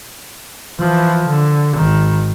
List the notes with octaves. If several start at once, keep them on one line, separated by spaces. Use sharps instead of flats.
E3 F3
D3
G#1 D#3